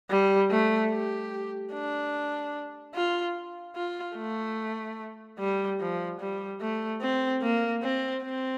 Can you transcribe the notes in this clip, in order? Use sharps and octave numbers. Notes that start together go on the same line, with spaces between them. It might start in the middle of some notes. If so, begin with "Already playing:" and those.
G3
A3
G4
D4
F4
F4
A3
G3
F3
G3
A3
C4
A#3
C4
C4